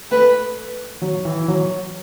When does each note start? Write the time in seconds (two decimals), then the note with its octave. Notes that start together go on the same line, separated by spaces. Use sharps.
0.11 A3 B4
1.02 F#3
1.25 E3
1.48 F#3